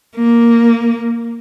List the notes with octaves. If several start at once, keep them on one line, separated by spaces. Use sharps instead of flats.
A#3